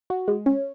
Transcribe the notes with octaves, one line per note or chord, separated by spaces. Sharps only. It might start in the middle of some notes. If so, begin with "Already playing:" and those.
F#4
G#3
C#4